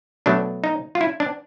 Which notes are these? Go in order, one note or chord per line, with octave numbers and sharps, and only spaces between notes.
B2 F#3 A3 D4
D#4
F4
E4
D4